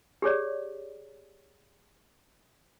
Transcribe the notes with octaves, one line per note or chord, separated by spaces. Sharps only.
G4 G#4 C#5 D5